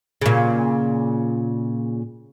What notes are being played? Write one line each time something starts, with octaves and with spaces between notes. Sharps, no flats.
A#2 C#3